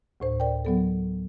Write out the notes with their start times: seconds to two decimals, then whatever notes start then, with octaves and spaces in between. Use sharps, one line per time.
0.20 D2 A2 C5
0.40 A#4 D5 G5
0.65 F#3 B3 A4